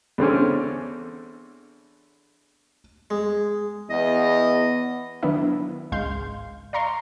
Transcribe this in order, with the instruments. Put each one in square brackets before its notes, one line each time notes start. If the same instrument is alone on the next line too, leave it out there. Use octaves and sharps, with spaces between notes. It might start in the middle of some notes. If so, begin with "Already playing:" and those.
[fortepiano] E2 D3 C4 C#4
[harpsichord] G#3
[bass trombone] E2 [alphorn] B3 [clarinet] D#5
[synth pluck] D#3 F#3 B3 D4 E4
G#1 C#2 G#3 F5 C6 G6
D5 F5 A#5 C6 C#6